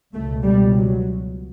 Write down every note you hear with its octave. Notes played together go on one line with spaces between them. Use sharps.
C#2 B2 A3
G3
F#3